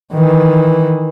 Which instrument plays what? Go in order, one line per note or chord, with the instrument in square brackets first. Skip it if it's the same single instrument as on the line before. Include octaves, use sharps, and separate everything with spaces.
[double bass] D#3 E3